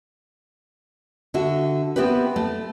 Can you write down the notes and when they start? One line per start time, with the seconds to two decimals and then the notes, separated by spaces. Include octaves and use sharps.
1.34 D3 F#4 E5
1.96 B3 C4 E4 G4 B4
2.36 A3